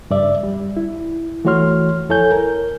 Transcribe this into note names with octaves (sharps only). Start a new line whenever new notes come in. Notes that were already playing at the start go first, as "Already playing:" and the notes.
G2 C#3 D5 E5
G3
E4
E3 A3 F#4 C#5 C6 F6
F2 E4 A4 C#5 G#5 G6
A#4